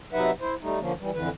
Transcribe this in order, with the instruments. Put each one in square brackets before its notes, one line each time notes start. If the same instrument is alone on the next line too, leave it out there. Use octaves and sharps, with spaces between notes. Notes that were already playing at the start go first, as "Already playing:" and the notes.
[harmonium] C3 F#3 D#4 B4 E5 F#5
E4 C5
G3 A3 D#4
D3 F3 A#3 C#4
E3 G3
F2 D3 E3 B4